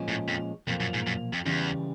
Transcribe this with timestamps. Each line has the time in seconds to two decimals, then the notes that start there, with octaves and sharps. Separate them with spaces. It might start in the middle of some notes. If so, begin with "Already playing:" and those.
Already playing: A#2 F3 G#3 C#4
0.08 A2
0.28 F2
0.67 B1 F2 A#2 F3 A#3
0.80 F#2
0.94 G#2
1.07 F#2
1.33 F2
1.45 E2 C#3 E3 G3